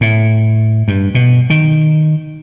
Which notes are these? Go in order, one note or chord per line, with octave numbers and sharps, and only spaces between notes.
A2
G2
B2
D#3